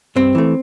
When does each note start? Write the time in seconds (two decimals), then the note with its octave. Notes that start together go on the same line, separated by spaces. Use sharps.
0.16 G2 C4
0.35 E3 A3